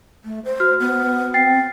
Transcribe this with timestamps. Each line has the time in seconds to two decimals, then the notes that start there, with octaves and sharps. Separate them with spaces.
0.25 A3
0.45 C5
0.60 F#4 F6
0.80 B3
1.34 C4 G5 A6 C7